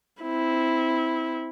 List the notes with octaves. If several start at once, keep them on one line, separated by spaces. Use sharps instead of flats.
C4 E4